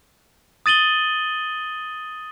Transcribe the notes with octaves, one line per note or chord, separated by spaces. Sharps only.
D#6 A6 D#7 F#7 G7